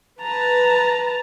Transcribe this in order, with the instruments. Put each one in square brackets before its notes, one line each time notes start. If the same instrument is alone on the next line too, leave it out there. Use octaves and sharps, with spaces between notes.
[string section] B4 [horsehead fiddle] A5 A#5